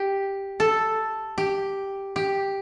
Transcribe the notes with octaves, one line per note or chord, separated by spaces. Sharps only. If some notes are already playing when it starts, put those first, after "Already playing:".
Already playing: G4
A4
G4
G4